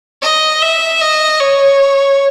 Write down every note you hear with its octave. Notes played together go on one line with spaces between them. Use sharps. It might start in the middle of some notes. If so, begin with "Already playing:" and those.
D#5
E5
D#5
C#5